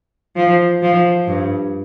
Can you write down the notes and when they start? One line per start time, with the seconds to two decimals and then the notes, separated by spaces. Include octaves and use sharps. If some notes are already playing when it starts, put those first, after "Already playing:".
0.36 F3
0.82 F3
1.28 G2